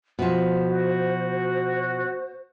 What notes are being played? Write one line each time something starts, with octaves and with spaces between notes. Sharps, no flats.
B2 F3 C5
F#4